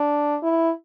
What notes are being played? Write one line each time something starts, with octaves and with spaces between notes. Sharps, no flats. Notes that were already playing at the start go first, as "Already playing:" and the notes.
Already playing: D4
E4